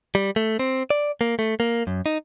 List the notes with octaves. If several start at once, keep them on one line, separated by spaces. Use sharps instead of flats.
G3
A3
C4
D5
A#3
A3
A#3
F#2
D#4